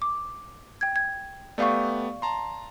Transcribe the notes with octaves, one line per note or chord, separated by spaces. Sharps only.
D6
G5 G#6
G#6
A3 B3 G4 D5 F5 C#6
A5 A#5 C6